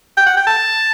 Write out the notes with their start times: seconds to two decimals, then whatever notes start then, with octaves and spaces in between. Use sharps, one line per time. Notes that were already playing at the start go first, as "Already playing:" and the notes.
0.17 G5
0.26 F#5
0.37 G5
0.47 A5